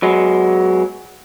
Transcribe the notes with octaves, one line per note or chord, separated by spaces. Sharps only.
F#3 G#3 B3